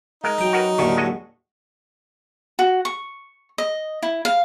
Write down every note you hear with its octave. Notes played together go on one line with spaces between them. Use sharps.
G#3 D#4 A#4
F#3 G5 A#5
F#4 A#4 B4
D#2 A2 D3 C#5
G#3 F#4 D#5
F#4
C#6
D#5
E4
F5